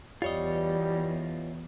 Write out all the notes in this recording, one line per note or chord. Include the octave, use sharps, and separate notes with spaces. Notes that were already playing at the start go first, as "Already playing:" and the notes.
E2 G3 F4 C#5 D#5